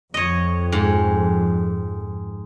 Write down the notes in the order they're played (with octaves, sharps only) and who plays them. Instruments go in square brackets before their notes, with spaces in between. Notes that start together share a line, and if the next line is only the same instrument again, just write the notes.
[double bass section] F2 [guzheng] C#5 D#5
[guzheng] G#2